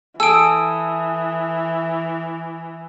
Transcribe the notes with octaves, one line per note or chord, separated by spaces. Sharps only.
E3 A4 G#5 D#6 E6 D7